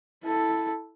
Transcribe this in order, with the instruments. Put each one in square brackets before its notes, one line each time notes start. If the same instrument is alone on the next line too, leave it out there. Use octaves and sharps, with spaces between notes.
[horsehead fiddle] E4 A4